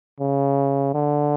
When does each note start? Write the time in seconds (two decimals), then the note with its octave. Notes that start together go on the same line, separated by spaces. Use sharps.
0.20 C#3
0.94 D3